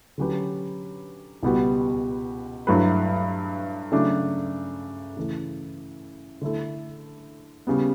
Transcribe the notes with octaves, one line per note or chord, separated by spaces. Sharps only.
D3 F#3 C#4 G4 B4
C#2 B2 G3 B3 F#4
G2 F#3 A3 E4 B4
C#3 F#3 A3 D4
C#3 E3 A3
D3 A3 E4 A4
C#3 G3 B3